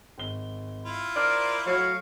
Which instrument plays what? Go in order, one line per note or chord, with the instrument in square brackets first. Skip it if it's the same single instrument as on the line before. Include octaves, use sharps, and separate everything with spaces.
[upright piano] G#1 G7
[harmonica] E4 F4
[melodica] A#4 C5 [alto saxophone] D5 [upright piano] F6
[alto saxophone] F#3 [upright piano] A3 [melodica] F5 C#6